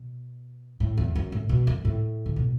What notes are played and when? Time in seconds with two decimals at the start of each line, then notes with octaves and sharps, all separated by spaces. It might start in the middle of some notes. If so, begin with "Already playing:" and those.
Already playing: B2
0.80 A2
0.97 E2
1.15 F#2
1.32 A2
1.49 B2
1.67 F#2
1.85 A2
2.26 D3
2.36 B2